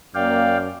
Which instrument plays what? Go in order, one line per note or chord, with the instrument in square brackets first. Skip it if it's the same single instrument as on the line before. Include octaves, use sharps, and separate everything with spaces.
[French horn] F#2 [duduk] A#3 [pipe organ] D5 F5 G5